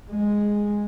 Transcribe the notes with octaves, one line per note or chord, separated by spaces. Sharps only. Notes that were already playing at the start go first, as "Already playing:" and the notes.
G#3